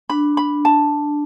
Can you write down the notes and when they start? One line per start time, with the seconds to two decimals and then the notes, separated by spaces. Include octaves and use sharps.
0.09 D4 B5
0.37 B5
0.65 A5